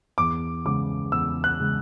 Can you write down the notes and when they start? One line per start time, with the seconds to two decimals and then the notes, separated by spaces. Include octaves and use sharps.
0.18 E2 D6
0.65 C#3 G#3 D6
1.12 E2 E6
1.44 F#6
1.60 C#3 G#3